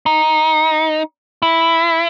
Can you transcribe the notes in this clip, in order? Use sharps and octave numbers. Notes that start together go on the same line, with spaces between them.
D#4
E4